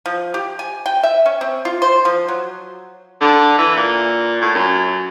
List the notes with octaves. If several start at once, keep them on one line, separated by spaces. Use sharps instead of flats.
F3
G4
G#5
G5
E5
C#4
C4
F4
C5
F3
F#3
D3
E3
A#2
A2
F#2